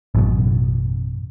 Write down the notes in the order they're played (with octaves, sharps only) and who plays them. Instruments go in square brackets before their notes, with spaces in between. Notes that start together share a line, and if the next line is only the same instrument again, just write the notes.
[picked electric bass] A1 F#2 B2